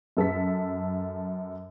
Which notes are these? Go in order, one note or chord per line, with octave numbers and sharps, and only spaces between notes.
F#2 A4 A5 B6